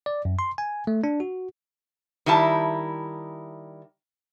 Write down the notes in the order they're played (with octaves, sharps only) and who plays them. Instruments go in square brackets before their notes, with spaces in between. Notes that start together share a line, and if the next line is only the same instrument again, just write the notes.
[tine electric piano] D5
F#2
C6
G#5
A3
D4
F#4
[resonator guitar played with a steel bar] D#3 G3 E4 A5